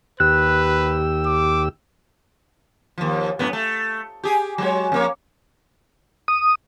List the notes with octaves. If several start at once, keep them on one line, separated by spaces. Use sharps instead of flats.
D#2 G4 B4 E6 F#6
D6
D#2 F3
F#2 A2 B3
A3
G4 G#4
F#3 G#3 C#5
F2 A#3 C#5
D#6